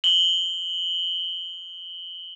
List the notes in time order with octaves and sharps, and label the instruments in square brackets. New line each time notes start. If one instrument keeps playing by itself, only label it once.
[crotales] F#7 G7